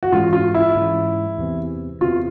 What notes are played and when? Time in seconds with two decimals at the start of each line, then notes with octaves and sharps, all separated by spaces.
0.03 F#4
0.12 G#2 E3 G#3 C#4 F4
0.33 F4
0.54 E4
0.75 G#2 E3 G#3 C#4
1.38 E2 C3 E3
2.01 E2 C3 E3 F4